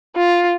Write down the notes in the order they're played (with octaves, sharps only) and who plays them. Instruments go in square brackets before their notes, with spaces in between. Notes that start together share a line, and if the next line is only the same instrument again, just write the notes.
[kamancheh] F4